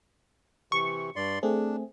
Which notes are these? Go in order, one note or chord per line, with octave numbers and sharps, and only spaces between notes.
C3 E3 C#6
G2 D5 C6
A3 C4 D4 G#4